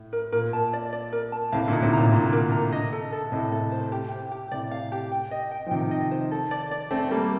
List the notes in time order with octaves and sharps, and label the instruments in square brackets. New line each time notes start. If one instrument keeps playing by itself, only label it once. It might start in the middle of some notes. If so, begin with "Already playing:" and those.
Already playing: [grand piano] A2
[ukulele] A#4
[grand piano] A#2 [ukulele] A#4
[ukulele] A5
D5
D5
A#4
A5
[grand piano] A2 C3 [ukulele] F5
[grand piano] A#2 D3
[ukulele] D#4
[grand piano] A2 C3
[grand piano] A#2 [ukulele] A#5
[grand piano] A#2 D3 [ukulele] A#5
[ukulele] A#4
A#5
D#5
A4
A4
[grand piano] A2 C3 [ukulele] D#5
[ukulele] A4
C5
G4
G4
G4
[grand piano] A2 C3 [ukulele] D5
[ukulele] F5
G4
G5
D#5
G5
[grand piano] F3
[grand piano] C3 D#3 [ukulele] G5
[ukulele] D#5
C5
A4
D5
D5
[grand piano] A3 C4 [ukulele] A4
[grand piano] G3 A#3 [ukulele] A4